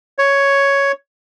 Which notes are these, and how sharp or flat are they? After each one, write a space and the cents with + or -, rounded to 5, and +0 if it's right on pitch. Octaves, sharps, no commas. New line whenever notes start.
C#5 +5